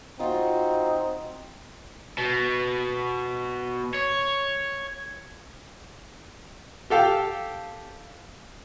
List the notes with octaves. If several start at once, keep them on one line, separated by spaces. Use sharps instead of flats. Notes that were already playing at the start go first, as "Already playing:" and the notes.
C4 D#4 F4 F#4
B2
C#5
G4 A4 F5 G5